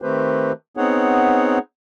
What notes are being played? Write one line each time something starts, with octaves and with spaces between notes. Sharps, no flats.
D#3 A3 C4 G4 B4 C5
B3 C4 D#4 G#4 C#5 F#5